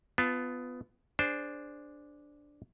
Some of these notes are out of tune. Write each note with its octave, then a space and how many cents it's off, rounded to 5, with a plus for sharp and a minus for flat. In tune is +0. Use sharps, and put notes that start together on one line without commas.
B3 +15 F4 -5 A5 +0
D4 +0 G#4 +0 C5 +0